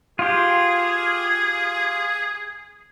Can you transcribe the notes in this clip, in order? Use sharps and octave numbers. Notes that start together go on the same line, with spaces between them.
F4 G4 G#4